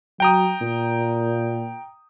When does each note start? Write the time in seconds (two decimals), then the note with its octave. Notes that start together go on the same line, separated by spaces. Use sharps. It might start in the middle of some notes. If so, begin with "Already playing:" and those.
0.20 F#3 G5 A#5 D#6
0.61 A#2